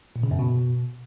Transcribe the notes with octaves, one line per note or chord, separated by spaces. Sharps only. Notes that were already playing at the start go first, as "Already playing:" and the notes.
A#2
C#3
F#2
B2